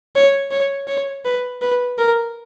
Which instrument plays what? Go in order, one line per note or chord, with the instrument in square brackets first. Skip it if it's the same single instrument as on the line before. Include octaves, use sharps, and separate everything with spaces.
[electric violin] C#5
C#5
C#5
B4
B4
A#4